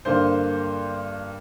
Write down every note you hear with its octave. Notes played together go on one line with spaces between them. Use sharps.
G2 D3 A#3 C5